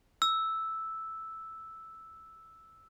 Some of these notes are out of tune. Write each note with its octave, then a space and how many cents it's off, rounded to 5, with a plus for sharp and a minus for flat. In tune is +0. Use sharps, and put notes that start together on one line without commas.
E6 -5